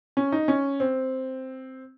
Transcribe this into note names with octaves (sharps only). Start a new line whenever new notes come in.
C#4
D#4
C#4
C4